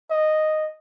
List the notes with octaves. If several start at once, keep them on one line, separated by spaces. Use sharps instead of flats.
D#5